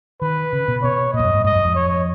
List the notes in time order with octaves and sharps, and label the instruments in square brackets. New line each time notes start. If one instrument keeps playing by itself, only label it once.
[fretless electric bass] D#3 [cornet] B4
[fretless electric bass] C#3
B2
[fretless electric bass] B2 [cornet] C#5
[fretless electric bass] A#2 [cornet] D#5
[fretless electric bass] F2
F#2
G#2
[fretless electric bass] G#2 [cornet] D#5
[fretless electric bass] F#2
F2
[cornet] C#5